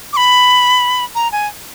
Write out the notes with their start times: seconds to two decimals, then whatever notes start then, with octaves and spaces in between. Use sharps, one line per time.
0.13 D6
0.17 B5
1.15 A#5
1.32 G#5